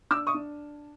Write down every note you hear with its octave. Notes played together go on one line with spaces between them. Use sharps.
D4 D6 E6
C#6 D#6
D4